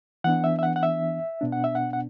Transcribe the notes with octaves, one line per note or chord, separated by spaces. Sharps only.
E3 B3 D4 F#5
E5
E5
F#5
F#5
E5
B2 B3 D4
F#5
E5
F#5
F#5